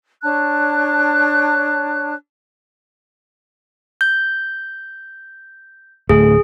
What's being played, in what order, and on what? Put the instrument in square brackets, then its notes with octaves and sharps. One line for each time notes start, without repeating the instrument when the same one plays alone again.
[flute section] D4 C#5 A5 F#6
[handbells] G6
[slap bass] D1 A3 [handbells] G#4